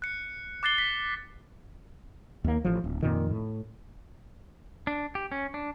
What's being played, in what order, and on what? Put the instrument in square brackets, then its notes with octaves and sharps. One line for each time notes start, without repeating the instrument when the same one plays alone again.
[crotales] F#6 C#7
D6 F#6 A6 C7 G7
B6
[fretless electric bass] D#2 A#3
A1 F3
D1
F2 A#2 D#3
A2
[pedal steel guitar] D4
G4
C#4
D4